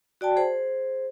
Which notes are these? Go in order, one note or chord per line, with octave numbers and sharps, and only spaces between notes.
F#4 D5 G5 A5
G#4 C5